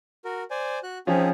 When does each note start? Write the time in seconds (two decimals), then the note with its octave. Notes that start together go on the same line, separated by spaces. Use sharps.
0.25 F#4 A#4
0.51 C5 D5 G#5
0.83 F#4 F#6
1.07 F3 C4 C#4 D#4 G#4